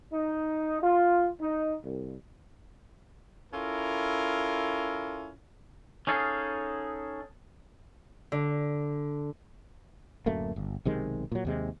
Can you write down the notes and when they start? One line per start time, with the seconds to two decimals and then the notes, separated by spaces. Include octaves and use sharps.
0.13 D#4
0.82 F4
1.41 D#4
1.84 C2
3.53 C#4 E4 F4 A4 A#4
6.07 C#4 D#4 G#4 A4 F5
8.32 D3
10.26 D1 F#2 A3 A#3
10.56 G1
10.85 B1 C3 D#3 G#3
11.32 A#2 F#3
11.45 D#2 C3 G#3